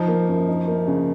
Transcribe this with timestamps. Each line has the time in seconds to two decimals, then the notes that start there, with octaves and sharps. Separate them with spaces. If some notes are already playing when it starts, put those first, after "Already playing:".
Already playing: F3 D#4
0.08 A#3
0.29 F#2
0.48 D#4
0.67 A#3
0.88 C#3